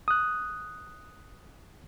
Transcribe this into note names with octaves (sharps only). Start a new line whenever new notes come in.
D#6 F#6